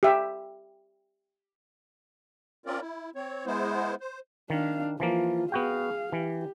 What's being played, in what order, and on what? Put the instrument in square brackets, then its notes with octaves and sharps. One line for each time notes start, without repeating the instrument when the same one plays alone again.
[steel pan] G4 E5
[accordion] C4 C#4 F4 A#4 D5
E4
C4 C#5
G#3 B3 E4 C5
C5
[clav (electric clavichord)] D#3 [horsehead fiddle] D4 F5
[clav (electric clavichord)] E3 F3 A#3 [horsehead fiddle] F4
[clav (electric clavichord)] B3 F#4 G5 [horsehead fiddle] G#4 F5
[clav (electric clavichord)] E3 [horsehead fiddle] G4